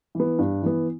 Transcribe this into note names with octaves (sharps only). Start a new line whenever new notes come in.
E3 B3
G2
E3 B3